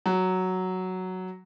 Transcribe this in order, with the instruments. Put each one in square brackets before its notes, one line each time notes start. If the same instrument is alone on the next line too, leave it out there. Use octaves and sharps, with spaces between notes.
[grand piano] F#3